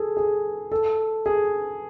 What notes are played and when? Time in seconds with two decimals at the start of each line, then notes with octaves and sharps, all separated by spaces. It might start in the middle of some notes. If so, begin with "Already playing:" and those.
Already playing: G#4 A4
0.17 G#4
0.72 A4
1.26 G#4